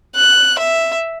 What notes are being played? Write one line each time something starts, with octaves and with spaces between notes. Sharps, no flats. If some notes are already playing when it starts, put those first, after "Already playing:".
F#6
E5